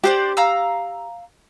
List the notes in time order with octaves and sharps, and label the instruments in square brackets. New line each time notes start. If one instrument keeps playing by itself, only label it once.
[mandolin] D4 C5 D5 [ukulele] G4
[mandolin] F5 A#5 E6